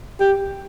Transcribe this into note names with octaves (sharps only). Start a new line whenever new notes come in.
G4